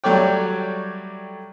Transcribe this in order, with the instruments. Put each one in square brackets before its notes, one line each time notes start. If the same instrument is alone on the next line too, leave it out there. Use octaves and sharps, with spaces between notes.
[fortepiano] F#3 G3 A3 C#5 D5 G5